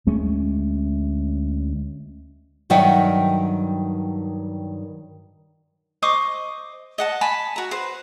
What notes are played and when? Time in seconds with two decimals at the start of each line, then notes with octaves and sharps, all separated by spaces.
0.07 D2 G#3 A3 C#4
2.70 G2 D#3 F#3 E5 F#5 G5
6.02 C5 D#5 C#6 D6
6.98 D#5 F#5 A5
7.21 G#5 A5 B5
7.56 F#4 A#5
7.71 B4 C5